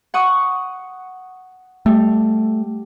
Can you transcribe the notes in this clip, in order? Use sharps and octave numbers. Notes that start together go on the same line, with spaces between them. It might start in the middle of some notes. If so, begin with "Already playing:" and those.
F#5 C#6 D#6
G3 A3